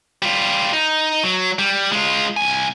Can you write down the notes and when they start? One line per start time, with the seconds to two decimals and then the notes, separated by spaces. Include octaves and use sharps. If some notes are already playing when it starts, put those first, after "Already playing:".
0.22 G3 F4
0.73 D#4
1.24 F#3
1.59 G3
1.92 G#3 F4
2.37 C2 G#5